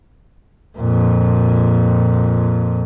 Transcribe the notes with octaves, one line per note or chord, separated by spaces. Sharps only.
F2 A#2